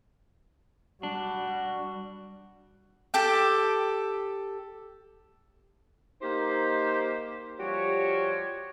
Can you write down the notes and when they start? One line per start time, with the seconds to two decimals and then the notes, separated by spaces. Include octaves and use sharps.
1.03 G3 D4 F#4
3.14 G4 A4 G5
6.22 A#3 D#4 G4 C5
7.59 F3 G3 F#4 G4 C#5